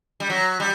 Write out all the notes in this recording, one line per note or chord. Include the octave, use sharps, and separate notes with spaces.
G3
F#3
G3